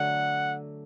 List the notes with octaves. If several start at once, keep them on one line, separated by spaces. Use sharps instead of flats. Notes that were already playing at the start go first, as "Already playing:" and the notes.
Already playing: D3 F#3 A3 F#5